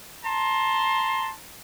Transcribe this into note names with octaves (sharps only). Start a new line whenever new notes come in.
A5 A#5 C6